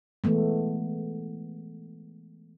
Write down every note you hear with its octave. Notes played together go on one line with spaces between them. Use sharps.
E3 G#3 A3 B3